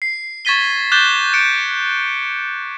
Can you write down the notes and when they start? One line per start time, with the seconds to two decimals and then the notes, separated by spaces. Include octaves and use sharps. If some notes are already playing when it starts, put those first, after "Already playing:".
0.02 C7
0.45 C#6 G#6 A6 B6 D#7 G7
0.92 D6 F#6 G6 A6 E7 G7
1.34 F#6 C#7 D7